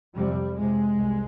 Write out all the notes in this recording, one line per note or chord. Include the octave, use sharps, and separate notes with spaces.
F2 C3 G3
F2 C3 G#3
C2